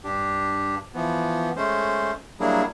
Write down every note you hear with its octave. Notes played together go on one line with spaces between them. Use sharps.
G2 D4 G4
E3 F3 B3
G#3 A3 C#4 C5
F#3 G3 A#3 D4 E4 G#4